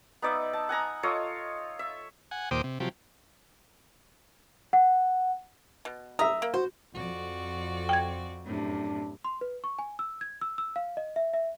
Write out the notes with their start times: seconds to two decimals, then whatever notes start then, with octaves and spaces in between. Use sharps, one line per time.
0.22 B3 D#4 D5 E5
0.53 A5
0.69 F#5 G#5 A#5 D#6
1.03 F4 A4 C#5 D#5
1.79 E5
2.31 F#5 G#5
2.51 D#2 A#2 C5 G5 D6 D#6
2.64 C3
2.80 C3 F3 F#3 G4
4.73 F#5
5.85 B2
6.19 E5 A#5 D#6
6.42 A#3
6.54 F#4 C5
6.94 F2 F#4 D5
7.89 G5 G#6
8.44 F#2 A2 C3 D4
9.25 C6
9.41 B4
9.64 C#6
9.79 G#5
9.99 E6
10.21 G#6
10.41 E6
10.58 E6
10.76 F5
10.97 D#5
11.16 E5
11.34 E5